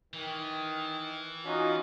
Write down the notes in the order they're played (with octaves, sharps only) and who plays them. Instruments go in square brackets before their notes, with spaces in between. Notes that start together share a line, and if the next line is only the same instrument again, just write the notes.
[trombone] D#3 [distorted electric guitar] E3
[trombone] C#4 [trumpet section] D#4 F4 F#4